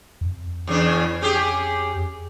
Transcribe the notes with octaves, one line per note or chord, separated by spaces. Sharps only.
F2
E2 C#3 D4
C#4 G4 G#4